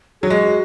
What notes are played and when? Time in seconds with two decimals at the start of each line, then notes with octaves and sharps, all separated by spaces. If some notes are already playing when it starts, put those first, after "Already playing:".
0.22 F#3 G#4
0.30 G#3 F#4